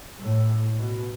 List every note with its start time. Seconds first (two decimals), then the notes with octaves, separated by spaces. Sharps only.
0.19 A2
0.77 B2